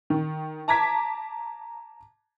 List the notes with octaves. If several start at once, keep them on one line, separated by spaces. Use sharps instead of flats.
D#3
A5 A#5 D6 G#6 B6